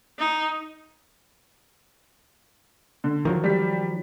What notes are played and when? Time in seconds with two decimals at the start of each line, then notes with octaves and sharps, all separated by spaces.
0.19 D#4
3.04 D3
3.25 D#3 F3 F#3
3.44 G3 B6